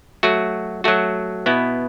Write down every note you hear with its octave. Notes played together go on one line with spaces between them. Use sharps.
F#3 A3 F#4
F#3 A3 F#4
B2 B3 E4